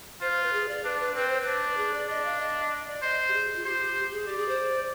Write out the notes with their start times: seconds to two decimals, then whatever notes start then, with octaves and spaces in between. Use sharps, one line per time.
0.21 F4 C5
0.32 C5
0.43 B4
0.53 G#4
0.68 D5
0.84 D4 B4
1.00 B4
1.15 C4 B4
1.28 C5
1.41 B4
1.46 D4
1.77 G#4
1.94 D5
2.08 D4 D#5
2.25 F5
2.40 D#5
2.72 D#5
2.87 D5
3.03 C5 D#5
3.28 G4
3.34 G#4
3.56 F4
3.65 G4 C5
4.12 G#4
4.27 G4 D5
4.38 G#4
4.48 C5